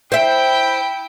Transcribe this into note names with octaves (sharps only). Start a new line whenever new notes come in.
E4 C5 E5 G5